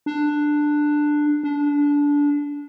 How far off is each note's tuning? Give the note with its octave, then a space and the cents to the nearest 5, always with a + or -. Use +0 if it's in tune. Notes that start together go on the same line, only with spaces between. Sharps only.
D4 +10
D4 -20